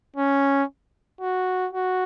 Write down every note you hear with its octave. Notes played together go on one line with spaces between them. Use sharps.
C#4
F#4
F#4